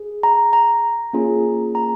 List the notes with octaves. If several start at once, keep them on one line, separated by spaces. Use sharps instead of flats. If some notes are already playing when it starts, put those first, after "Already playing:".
Already playing: G#4
A#5
A#5
A#3 C#4 F4 G#4
A#5